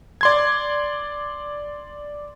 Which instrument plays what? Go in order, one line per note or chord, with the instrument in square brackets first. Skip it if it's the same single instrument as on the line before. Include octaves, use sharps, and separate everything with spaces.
[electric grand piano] D5 C6 G#6